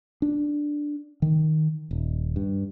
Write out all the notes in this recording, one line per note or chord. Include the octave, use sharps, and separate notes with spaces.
D4
D#3
D#1
G2